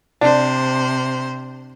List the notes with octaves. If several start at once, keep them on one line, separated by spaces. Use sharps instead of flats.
C3 D4 C5